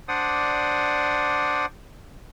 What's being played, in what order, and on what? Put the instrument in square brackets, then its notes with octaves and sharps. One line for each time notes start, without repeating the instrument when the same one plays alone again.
[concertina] D4 C5 D5 F#5 D#6